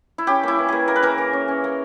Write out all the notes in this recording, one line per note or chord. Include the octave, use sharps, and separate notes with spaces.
E4
C#4 G4
A#3 E4
E3
A#3 G#4
A#3 A#4
B4
E3 A#4
E3
C#4
C#4
A#3